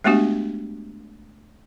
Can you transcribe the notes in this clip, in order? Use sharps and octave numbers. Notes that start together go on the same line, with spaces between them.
G#3 A3 B3 D4 F#4 G4